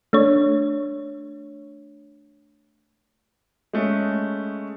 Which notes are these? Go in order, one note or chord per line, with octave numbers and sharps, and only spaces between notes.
A3 D4 C#5
G#3 A3 C#4